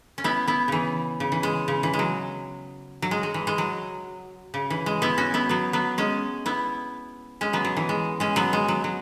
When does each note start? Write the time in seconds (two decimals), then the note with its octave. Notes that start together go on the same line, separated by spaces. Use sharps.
0.18 C#4
0.24 B3 E4
0.47 B3 E4
0.68 C#3 E3
1.20 C#3
1.32 E3
1.43 G#3
1.68 C#3
1.83 E3
1.93 G#3
1.99 F#3
3.02 F#3
3.11 G#3
3.23 G#3
3.34 E3
3.47 G#3
3.58 F#3
4.54 C#3
4.70 E3
4.86 G#3
5.02 B3 E4
5.18 C#4 F#4
5.34 B3 E4
5.49 F#3 B3
5.73 F#3 B3
5.98 G#3 C#4
6.46 B3 E4
7.41 G#3 C#4
7.53 F#3 B3
7.65 F#3
7.77 E3
7.89 G#3
8.20 G#3 C#4
8.36 F#3 B3
8.53 G#3
8.68 F#3
8.84 F#3